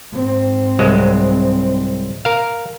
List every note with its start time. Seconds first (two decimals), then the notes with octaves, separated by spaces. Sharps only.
0.13 G#2 C4
0.79 C2 F#3 G#3
2.25 A#4 F5